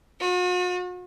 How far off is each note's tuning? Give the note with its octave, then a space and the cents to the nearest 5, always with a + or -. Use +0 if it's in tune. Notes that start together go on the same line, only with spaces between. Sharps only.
F#4 -45